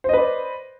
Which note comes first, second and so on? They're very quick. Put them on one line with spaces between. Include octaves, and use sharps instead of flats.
C5 D#5 B4 D5